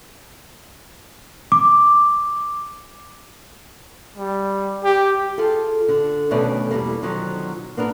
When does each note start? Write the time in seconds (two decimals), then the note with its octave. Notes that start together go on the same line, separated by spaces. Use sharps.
1.52 D6
4.16 G3
4.84 G4
5.38 F4 G#4 A4
5.88 D3
6.31 D2 B2 D#3 A3 C#4 D5
6.71 E2 G2 G3 A#3
7.02 B2 D3 D#3 F3 F#3
7.77 A#3 B3 D4 A#4